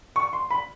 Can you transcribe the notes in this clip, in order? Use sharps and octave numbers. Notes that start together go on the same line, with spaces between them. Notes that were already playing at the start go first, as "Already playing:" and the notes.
C#6
C6
B5